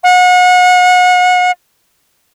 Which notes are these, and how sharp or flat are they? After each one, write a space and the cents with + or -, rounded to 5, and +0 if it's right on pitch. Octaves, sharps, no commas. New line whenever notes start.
F#5 -35